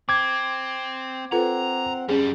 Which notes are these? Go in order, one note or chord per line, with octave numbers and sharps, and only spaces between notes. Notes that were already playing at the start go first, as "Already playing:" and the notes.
C4 D6 G#6
C4 F4 A4 B4 F#5 A#5
F#2 G3 C#4 G#4